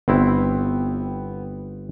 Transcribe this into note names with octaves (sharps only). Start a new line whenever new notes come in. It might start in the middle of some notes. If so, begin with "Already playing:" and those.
G1 B3 C4 E4 G5